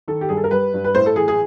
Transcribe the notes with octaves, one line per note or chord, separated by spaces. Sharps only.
D#3 A4
G4
G2 G#4
A4
A#4
G3 B4
G2
B4
A2 C5
A4
E3 G#4
G#4